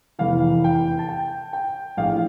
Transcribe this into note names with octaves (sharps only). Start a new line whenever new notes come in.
F1 E2 E3 F5
G5
A5
G5
G5
A#1 A2 E3 F5